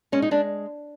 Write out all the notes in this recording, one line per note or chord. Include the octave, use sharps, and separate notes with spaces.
G#3 C#4
D#4
G#3 D4